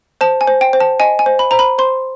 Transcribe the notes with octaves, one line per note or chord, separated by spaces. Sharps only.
C5 A5
G#5
C5
G5
C5
A5
D#5 G#5
G#5
C5
B5
C5 A#5
B5
C5 C6